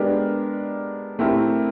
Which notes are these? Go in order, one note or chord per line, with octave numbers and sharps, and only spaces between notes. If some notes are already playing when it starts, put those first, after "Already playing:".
Already playing: G#3 B3 D4 G4 A#4
A3 C4 E4 G4 A#4